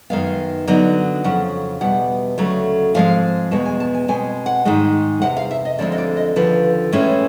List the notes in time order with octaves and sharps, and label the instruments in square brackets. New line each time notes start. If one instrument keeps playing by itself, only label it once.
[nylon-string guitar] F#2 D#3 G#3 B3 F5
D3 F#3 B3 D#4
F2 C#3 F#3 F#5
E2 B2 G3 B3 F#5
D2 C#3 F#3 A3
G#2 F3 G#3 C4 F5
E2 B2 G#3 B3 A5
G#5
A5
G#5
B2 G#3 C4 G#5
F#5
G#2 D#3 G#3
E2 C3 F#5
F5
E5
D#5
D2 D3 F3 G#3 C4 D5
D#5
D5
D#5
D#2 D3 F3 B4
A2 E3 G#3 C#4